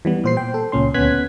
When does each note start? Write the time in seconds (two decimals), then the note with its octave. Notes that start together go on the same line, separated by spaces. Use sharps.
0.05 E3 G3 B3
0.24 A#2 C5 C7
0.37 G5
0.54 A4
0.72 C#2 A#2 C#4 C6
0.94 D2 B3 C#4 F#6 G#6 B6